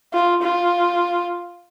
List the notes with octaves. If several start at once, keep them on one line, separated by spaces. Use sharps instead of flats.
F4
F4